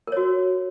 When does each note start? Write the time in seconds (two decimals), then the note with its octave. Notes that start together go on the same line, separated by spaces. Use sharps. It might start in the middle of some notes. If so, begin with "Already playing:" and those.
0.07 A#4
0.12 C#5
0.17 F#4